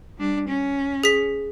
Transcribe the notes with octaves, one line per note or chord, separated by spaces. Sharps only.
G3 D4
C#4
G#4 B6